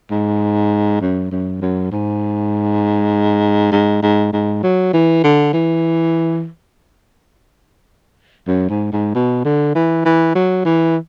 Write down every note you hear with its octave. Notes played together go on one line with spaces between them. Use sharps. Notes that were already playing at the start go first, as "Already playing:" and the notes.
G#2
F#2
F#2
F#2
G#2
G#2
G#2
G#2
F#3
E3
D3
E3
F#2
G#2
G#2
B2
D3
E3
E3
F#3
E3